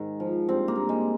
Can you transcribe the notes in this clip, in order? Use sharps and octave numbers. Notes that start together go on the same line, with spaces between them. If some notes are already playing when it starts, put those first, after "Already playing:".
Already playing: G#2 D#3
F3
G2 C4
A#3
G2
G#3